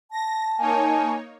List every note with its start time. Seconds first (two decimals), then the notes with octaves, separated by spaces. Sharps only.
0.11 A5 A#6
0.58 A#3 D#4 C#5 G#5